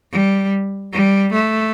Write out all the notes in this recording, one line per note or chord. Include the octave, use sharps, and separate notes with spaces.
G3
G3
A3